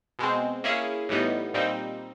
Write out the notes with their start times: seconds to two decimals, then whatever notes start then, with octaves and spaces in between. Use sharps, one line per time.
0.19 B2 G#3 C4
0.64 A#3 C#4 E4 G#4
1.09 A2 E3 G3 B3 D#4
1.54 A#2 G3 C4 D#4